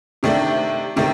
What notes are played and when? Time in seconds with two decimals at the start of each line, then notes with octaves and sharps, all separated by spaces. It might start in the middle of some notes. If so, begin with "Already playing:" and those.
0.23 C3 D#3 A3 D4
0.96 C3 D#3 A3